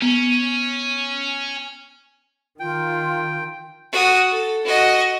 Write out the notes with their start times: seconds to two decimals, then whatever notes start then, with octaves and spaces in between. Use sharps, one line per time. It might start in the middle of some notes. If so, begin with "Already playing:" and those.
0.02 B3 C#4
2.60 D#3 F4 G5
3.92 F#4 D#6
4.30 A4
4.64 F#4 D#5